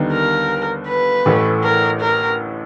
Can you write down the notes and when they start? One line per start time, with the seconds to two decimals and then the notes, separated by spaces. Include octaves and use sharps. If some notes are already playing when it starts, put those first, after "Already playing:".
Already playing: D#2 D3 G3 B3 D#4
0.12 A#4
0.88 B4
1.26 A1 A2 E3 A3
1.63 A#4
2.01 A#4